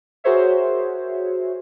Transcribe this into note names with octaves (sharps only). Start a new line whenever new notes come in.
F#4 G#4 A#4 C5 C#5 E5